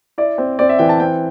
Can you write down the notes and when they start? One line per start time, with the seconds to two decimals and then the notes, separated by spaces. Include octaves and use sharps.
0.18 E4 D5
0.38 C4
0.59 C4 D5
0.69 E5
0.79 E3 G5
0.89 A5
1.00 C4 G5